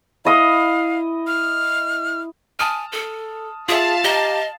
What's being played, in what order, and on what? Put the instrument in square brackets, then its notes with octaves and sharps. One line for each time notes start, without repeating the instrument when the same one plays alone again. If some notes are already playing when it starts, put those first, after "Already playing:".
[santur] E4 D#5 D#6 [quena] F5
[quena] F6
[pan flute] G#5 [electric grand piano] A5 D#6 F6
[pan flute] A4
[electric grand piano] F4 E5 [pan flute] G#4 [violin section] F5 A5
[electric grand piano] G4 A#5 [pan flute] D#5